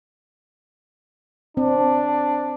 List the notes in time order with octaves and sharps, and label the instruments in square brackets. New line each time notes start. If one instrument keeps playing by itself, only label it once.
[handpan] C4 [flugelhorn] D4